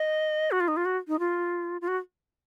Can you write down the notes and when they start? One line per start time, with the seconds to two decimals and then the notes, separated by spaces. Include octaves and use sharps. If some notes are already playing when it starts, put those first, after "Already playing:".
Already playing: D#5
0.51 F#4
0.60 F4
0.68 D#4
0.77 F4
0.85 F#4
1.08 D#4
1.19 F4
1.81 F4
1.88 F#4